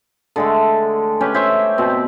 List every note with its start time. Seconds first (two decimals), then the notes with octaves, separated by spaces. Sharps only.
0.36 D3 G#3 A3
1.21 C#4 G4 B4
1.34 C5 C#5 E5
1.78 B2 C4